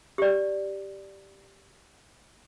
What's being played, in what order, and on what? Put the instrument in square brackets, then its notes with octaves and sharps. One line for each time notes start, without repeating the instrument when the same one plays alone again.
[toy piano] G4 D5